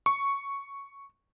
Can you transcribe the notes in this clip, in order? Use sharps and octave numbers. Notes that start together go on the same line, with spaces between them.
C#6